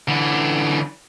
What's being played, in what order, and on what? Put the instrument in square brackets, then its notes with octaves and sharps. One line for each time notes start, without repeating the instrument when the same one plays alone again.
[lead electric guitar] D3 E3